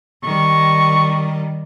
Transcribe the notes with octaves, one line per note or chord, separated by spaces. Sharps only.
D#3 G3 C#6